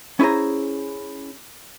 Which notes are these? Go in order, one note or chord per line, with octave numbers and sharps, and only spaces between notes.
C#4 E4 G#4 C5 A#5